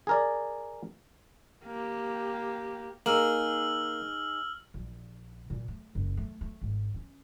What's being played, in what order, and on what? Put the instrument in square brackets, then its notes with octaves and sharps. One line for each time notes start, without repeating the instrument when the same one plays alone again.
[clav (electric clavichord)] G#4 A#4 D5
[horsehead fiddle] A#3 G4
[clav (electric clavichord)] A#3 [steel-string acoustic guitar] D#4 G#4 [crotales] E6 F6 F#7
[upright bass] A#1
A#2
A3
F#1
A3
A3
G#1
C#4